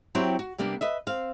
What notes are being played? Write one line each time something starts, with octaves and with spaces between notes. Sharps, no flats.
F#3 C4 E4 G4 C5 C#5
F#4
C3 G3 A#3 B3 D4
B4 D#5 E5
C4 F5